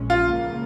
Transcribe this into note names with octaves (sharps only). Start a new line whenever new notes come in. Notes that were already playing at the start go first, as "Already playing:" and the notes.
Already playing: A#1 A#2 G#3 C#4
F4
C#2 C#3 F3 A#3